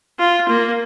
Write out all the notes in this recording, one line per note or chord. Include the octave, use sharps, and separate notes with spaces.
F4
A#3